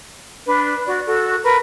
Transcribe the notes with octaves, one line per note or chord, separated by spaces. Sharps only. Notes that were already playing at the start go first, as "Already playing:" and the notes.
D4 B4
F#4 D5
F#4 A4
A#4 B4